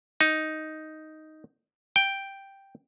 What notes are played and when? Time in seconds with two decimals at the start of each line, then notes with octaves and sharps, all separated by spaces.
0.21 D#4
1.96 G5